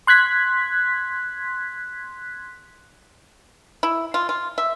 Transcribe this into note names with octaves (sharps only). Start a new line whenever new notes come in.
C6 F#6 G#6 B6
E4
F4
F4
E5